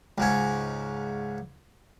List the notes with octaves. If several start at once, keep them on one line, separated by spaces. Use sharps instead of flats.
C#2 G#2 C#4